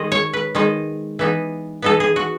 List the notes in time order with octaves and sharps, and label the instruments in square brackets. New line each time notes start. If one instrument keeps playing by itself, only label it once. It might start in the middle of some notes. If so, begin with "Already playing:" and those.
Already playing: [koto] D#3 G#3 D#4 D#5
C#5
B4
D#3 G#3 D#4
E3 B3 D#4
E3 B3 D#4 A4
G#4
F#4